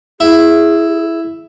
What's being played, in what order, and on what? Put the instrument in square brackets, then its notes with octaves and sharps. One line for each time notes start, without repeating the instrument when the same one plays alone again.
[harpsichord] E4 [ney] G#4